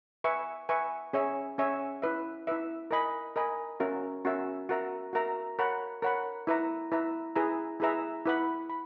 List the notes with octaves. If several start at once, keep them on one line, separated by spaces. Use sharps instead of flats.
B4 E5 G#5 C#6
B4 E5 G#5 C#6
C#4 G#4 C#5 E5 G#5
C#4 G#4 C#5 E5 G#5
E4 B4 E5
E4 B4 E5
A#4 D#5 G#5 B5
A#4 D#5 G#5 B5
C#4 F#4 A#4 E5
C#4 F#4 A#4 E5
F#4 A#4 E5 A#5
F#4 A#4 E5 A#5
A#4 C#5 F#5 B5
A#4 C#5 F#5 B5
E4 B4 E5 A#5
E4 B4 E5 A#5
E4 G#4 B4 E5 A#5
E4 G#4 B4 E5 A#5
E4 B4 F#5 B5
B5